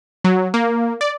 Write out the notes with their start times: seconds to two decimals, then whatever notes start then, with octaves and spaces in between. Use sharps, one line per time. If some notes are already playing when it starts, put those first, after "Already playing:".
0.24 F#3
0.54 A#3
1.01 D5